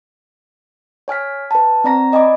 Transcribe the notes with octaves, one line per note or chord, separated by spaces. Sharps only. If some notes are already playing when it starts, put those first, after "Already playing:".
C#5 G#5 F6 B6
B4 A5
C4 D5 A#5 A#6
D5 D#5 G#5 B5 D6